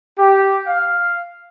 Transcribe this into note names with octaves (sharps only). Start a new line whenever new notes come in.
G4
F5